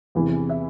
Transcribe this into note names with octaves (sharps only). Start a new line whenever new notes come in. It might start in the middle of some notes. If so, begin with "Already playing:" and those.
E2 C3 E3
E5